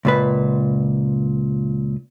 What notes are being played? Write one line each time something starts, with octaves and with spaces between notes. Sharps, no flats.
C#2 A#2 B4